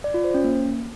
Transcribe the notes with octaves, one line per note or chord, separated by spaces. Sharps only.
D5
F4
C5
C#4
A#3